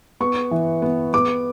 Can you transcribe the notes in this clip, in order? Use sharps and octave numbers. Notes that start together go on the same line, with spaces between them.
B3 C#6
E3
B3
B3 D6